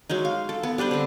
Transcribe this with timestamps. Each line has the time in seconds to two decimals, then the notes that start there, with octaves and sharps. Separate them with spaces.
0.10 F#3 G#3 D#4
0.25 F5
0.49 A4
0.63 B3
0.78 G3 D4 B4 C5
0.91 D3 C4